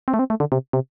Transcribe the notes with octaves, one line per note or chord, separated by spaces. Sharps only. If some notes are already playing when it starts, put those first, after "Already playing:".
C4
A3
C4
A3
D3
C3
C3